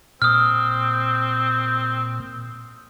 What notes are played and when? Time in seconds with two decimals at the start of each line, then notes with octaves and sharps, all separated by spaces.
0.22 A#2 C4 D#6 F6